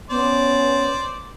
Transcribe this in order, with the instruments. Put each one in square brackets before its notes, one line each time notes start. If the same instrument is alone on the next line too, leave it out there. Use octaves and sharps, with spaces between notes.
[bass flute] B3 [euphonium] C#4 [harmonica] C5 D5